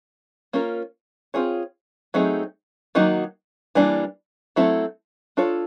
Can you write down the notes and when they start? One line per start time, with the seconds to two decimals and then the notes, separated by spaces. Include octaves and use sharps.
0.53 A#3 C#4 F4 A#4
1.34 C4 F4 G#4 C#5
2.14 F#3 A3 C4 D#4 G#4
2.95 D#3 F#3 A#3 D#4 F#4
3.75 E3 G3 A#3 D4
4.56 F#3 A3 C4 E4 A4
5.37 D4 F4 A4 C#5